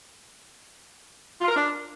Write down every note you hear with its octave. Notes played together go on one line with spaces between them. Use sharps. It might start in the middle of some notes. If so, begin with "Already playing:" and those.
F4
A#4
D4